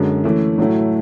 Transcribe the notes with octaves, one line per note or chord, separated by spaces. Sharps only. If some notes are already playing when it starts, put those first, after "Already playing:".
Already playing: F#2 D3 G#3
E3 A3 C#4 E4
A2 F#3 A3 E4